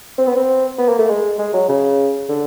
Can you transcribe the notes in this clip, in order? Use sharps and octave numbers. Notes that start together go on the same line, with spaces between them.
C4
B3
C4
B3
A#3
A3
G#3
G#3
F#3
C#3
D3